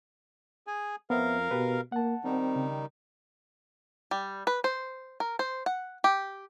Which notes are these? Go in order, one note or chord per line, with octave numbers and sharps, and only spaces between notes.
G#4 G#5
F2 B3 A#4 C5 E5 F5
B2 G4 B4
A#3 F#5 A5
D#3 G3 C4 D#4
C#3
G3
B4
C5
A#4
C5
F#5
G4